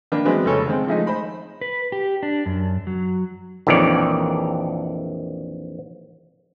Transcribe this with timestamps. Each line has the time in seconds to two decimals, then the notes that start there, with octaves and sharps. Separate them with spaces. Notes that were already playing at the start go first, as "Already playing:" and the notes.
0.12 D#3 A#3 D4 B4
0.25 E3 F#3 G#3 B3 C4 D4
0.45 F1 C#3 A4 C#5
0.68 D#3 G#3 C4
0.87 F3 G#3 A3 D#4
1.07 C5 B5
1.61 B4
1.92 G4
2.23 D4
2.46 F#2
2.87 F#3
3.67 A#1 F2 D#3 E3 C#5 D5